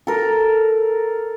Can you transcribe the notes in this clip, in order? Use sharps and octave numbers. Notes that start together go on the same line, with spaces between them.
A4 A#4